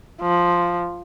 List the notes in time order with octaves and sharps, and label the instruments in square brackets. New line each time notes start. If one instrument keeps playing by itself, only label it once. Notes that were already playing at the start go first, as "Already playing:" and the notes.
[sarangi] F3